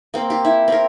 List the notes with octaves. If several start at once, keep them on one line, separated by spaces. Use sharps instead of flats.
A#3 C4
G4
E4
C4 A#4